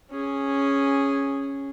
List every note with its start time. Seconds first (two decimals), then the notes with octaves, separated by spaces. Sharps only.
0.11 C#4 G#4